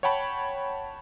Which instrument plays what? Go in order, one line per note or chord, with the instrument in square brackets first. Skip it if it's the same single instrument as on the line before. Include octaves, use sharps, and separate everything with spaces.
[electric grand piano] C#5 F#5 G5 A5 B5